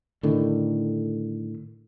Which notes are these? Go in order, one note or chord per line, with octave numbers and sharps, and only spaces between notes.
A2 D3 D#3